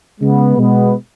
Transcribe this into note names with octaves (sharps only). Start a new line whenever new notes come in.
C#3 G#3 B3
B2 G#3 B3